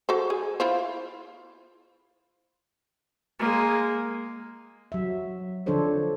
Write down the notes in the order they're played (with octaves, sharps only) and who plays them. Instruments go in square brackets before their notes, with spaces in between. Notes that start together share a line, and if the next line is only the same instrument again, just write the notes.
[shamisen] F#4 A4 C5
G#4
E4 F4 C5
[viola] G#3 A#3
[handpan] F#3 E5
D3 F3 D4 A4 C5 C#5